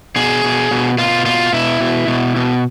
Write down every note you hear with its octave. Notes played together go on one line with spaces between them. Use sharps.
B2 G#4
B2
B2
B2 F4
B2 F4
B2 E4
B2
B2
B2